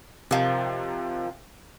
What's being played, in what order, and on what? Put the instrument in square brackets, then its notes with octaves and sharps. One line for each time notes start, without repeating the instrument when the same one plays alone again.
[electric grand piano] C3 [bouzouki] D#3 F3